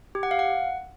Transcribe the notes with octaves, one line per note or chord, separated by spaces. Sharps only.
G4
F#5
F5
F#5